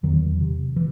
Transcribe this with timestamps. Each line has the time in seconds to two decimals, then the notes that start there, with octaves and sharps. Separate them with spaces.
0.03 E2 D#3 F#3
0.41 C3
0.76 E3